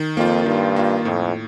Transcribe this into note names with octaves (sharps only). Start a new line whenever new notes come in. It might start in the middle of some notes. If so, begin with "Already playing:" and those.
Already playing: D#3
F2 A#3 F4
G2 D#3
A#3 F4
F2 A2